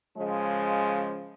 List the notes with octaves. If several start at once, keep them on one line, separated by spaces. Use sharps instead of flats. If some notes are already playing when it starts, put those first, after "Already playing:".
C#3 F3 G#3